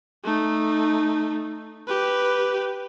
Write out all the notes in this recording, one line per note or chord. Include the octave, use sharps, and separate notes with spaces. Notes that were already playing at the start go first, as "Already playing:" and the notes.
A3 D#4
G4 B4